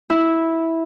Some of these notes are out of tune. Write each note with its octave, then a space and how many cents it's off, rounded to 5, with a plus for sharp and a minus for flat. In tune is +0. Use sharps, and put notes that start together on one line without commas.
E4 -10